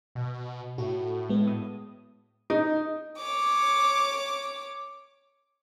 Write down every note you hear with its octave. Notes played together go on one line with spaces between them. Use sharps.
B2
A2 F#4
G#3 B3
D#6
D#4
C#5 D6